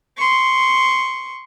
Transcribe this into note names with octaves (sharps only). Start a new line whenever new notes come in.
C6 C#6